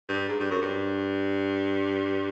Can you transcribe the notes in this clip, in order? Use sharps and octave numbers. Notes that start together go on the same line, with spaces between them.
G2
G#2
G2
F#2
G2